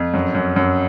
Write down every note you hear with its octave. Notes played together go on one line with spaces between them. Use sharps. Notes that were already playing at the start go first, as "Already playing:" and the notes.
Already playing: F2
F#2
F#2
F#2